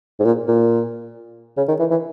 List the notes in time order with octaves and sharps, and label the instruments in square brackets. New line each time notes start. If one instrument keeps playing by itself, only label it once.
[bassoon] G#2
A#2
A#2
C#3
D#3
E3
E3